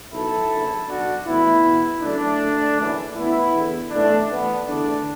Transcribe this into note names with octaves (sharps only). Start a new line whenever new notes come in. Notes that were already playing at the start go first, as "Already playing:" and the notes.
B1 B2 E4 A4
F#1 F#2 D3
B1 B2 D4 F#4
A1 A2 E3 B3 E4
E2 B2
F#1 F#2 D3 A3 D4
D2 D3
F#1 F#2 E3
A1 A2 E3 B3 E4
E2 D3
B1 A2 E3 A3 D4
A1 A2 E3 B3
E2 D3 A3 D4